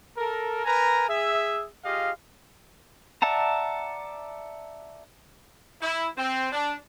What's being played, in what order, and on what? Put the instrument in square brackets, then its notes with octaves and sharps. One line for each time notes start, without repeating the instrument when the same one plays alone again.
[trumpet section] A4 A#4
A#4 B4 G#5 A#5
G#4 E5
F4 G4 G#4 D#5 F5
[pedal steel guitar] D5 E5 F#5 A5 A#5
[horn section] E4
C4
D4